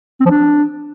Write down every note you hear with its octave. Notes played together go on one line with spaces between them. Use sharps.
C4
F3
D4